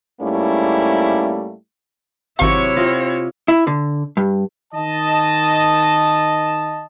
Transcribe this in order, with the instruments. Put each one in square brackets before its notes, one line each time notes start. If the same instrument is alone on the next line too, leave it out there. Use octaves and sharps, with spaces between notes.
[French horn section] G#2 G3 A3 A#3 C#4 E4
[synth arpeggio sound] G#1 F5 [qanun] C3 F#3 [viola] E4 C#5 [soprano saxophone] C#6
[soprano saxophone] C4 [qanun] F4 A#4 D#5
[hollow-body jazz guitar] E4
D3
G2
[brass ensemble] D#3 D#5 A5